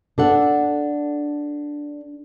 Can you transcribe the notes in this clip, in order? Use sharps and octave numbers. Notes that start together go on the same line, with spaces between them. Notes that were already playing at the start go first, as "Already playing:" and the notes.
D4 A4 F#5